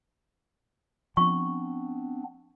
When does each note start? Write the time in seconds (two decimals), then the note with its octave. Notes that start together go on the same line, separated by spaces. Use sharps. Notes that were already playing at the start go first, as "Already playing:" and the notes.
1.17 F3 B3 C4 D4 C#6